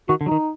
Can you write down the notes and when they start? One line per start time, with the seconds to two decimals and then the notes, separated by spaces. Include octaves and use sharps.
0.09 D#3 F#4
0.21 D3
0.26 F#3 D#4
0.31 D#3